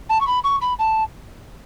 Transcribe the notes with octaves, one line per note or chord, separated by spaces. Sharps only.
A5
C#6
B5
C#6
B5
A5